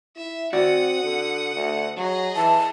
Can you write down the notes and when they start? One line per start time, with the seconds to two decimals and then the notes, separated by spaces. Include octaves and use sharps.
0.17 E4 E5
0.53 C4 F#4 D5 F#5 D#6
1.03 D3
1.56 D2
1.97 F#3 G#4 D#5
2.36 E3 A5